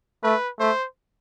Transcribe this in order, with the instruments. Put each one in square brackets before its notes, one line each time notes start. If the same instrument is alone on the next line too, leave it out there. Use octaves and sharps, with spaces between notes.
[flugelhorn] A3 [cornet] B4
[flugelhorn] A3 [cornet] C5